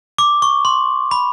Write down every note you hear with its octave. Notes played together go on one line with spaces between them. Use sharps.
D6
C#6
C6
B5